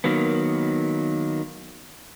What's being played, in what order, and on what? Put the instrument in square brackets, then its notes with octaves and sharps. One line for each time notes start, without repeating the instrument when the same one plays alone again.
[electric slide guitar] D#3 F#3 A#3 B3